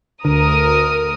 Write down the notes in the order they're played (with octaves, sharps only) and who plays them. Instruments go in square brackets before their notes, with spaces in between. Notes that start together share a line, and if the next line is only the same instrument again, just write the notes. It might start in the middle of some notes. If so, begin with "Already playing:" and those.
[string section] D2 A#4 D#6 [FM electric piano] D3